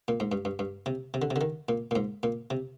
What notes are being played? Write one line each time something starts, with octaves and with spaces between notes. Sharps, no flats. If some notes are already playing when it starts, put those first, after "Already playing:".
A#2
G#2
G2
G2
G2
C3
C3
D3
C3
D3
D#3
A#2
A#2
G#2
A#2
C3